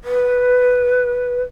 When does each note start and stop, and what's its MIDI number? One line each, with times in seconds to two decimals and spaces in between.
0.04 1.42 71